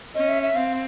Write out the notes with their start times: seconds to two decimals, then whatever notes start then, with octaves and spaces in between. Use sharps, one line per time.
0.15 C#4 D#5
0.29 E5
0.43 E5
0.56 C4 F5